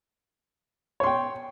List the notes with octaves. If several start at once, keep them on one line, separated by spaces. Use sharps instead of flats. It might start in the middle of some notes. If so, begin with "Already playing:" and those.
C#5 G5 C6